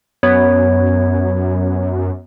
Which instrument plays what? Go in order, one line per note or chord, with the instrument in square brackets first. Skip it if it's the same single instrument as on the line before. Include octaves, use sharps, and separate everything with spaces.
[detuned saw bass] F#2 [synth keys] B3 [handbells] C#5